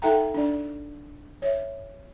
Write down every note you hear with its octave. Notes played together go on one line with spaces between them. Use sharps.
D#4 A4 E5 F#5 G5 A#5
D4 D5
C#5 E5